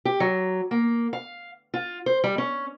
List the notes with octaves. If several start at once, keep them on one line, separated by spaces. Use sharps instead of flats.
G4
F#3
A#3
F5
F4
C5
G3
C#4